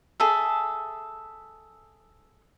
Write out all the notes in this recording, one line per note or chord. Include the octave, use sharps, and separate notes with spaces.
G#4 A4 E5